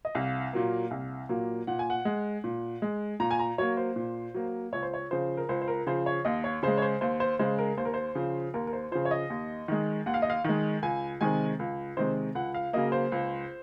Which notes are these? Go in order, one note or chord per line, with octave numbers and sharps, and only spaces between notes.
D#5
C2 F5
A#2 F#3 A#3
C2
A#2 F#3 A#3
A#2 F#5
G#5
F#5
G#3
A#2
G#3
A#2 A#5
G#5
A#5
F#3 A#3 C#5
C5
A#2
F#3 A#3
C#2 C#5
C5
C#5
C#3 F3 C5
A#4
C#2 C5
C5
A#4
C#3 F3 C5
C#5
D#2 D#5
C#5
C#3 G#3 C5
C#5
C5
D#2 C5
C5
C#3 G#3 C5
A#4
D#2 C5
A#4
C5
C#3 F3
D#2 A#4
A#4
C5
C#3 F3 C5
C#5
D#5
D#2
D#3 G#3
D#2 F#5
F5
D#5
F5
D#3 G#3
C#2 G#5
C3 D#3 G#3 G#5
C#2
C3 D#3 G#3 C5
C#2 F#5
F5
C#3 F#3 A#3 D#5
C5
C#2